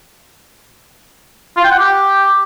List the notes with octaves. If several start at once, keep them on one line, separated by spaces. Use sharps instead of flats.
F4
G5
F#5
G4